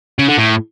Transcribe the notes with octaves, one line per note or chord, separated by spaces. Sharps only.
C#3
D3
A2